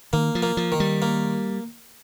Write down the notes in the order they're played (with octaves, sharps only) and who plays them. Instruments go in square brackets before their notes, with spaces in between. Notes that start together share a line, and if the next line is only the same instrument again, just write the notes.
[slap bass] D#3 [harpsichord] A#3
[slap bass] F3
[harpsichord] A#3
[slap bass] F3
[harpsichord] D#3
[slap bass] G3
[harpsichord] A#3